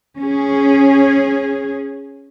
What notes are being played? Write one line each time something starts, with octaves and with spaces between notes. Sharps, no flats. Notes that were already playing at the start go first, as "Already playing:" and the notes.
C#4 G#4